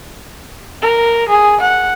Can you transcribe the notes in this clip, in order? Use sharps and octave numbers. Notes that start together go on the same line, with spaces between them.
A#4
G#4
F#5